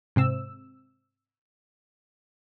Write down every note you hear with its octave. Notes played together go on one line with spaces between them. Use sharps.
G#2 C3 C4 E6